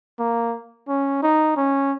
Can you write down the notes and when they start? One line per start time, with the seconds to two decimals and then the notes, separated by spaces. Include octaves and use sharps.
0.19 A#3
0.88 C#4
1.23 D#4
1.57 C#4